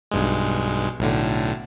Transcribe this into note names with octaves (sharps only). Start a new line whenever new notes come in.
B1 G2 G#3
B1 A2 D3